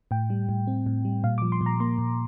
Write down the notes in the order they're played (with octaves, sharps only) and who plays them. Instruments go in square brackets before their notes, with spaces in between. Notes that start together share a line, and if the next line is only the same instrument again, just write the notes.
[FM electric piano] A2 G5
G3
A2
C4
A2
G3
A#2 F5
F3 D6
C6
A#2
A#5
A#3 C6
A#2